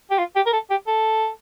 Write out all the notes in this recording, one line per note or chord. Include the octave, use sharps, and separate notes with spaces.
G4
F4
G4
A#4
A4
G4
A4